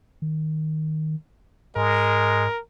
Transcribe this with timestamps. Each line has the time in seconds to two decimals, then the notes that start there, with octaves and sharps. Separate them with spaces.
0.22 D#3
1.76 G#2 G#3 A#4